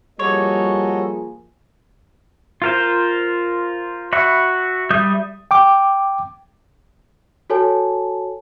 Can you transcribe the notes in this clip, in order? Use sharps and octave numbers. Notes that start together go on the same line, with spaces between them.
F3 G3 A#3 F#4 G#4 A4 C#5 D#5
F4 A#4 C5
F#4 E5 B5 C#6
G3 E5 D#6 G6
G5 D6
F#4 A4 C#5 G#5 A5